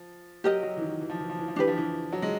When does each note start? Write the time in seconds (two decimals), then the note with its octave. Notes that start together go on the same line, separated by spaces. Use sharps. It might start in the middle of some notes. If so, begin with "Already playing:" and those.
Already playing: F3
0.44 F#3 G4 A#4 D#5
0.63 F#3
0.77 E3
0.81 D#3
1.01 E3
1.09 F3
1.20 E3
1.29 F3
1.38 E3
1.48 F3
1.56 E3 D4 G4 B4
1.67 F3
1.78 E3
2.12 F#3
2.22 G#3